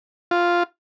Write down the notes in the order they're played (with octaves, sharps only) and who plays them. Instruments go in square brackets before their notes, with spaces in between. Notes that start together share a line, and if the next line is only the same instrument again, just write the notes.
[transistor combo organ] F4